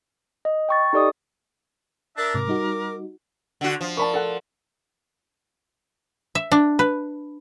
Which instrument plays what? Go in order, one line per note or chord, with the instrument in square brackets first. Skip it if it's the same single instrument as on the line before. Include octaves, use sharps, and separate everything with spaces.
[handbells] D#5
G5 C#6 A6
D#4 G4 A4 D5 D#5 D#6
[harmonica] D4 E5 A5 [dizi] A#4
[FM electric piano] G#2 C3 [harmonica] D6
[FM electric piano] G3 D#4 F#4
[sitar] D3 F#4
F3
[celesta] A#4 D5 [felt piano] A5 B5 C#6
[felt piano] A4 F#5
[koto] E5
D4
B4